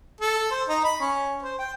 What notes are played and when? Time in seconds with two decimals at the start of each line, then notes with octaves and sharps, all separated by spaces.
0.21 A4
0.51 C5
0.69 D#4
0.84 B5
1.00 C#4
1.43 C5
1.59 G5